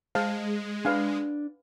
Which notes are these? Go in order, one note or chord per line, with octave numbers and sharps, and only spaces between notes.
G#3 C5 F5 A5
D4 B4 F5 G#5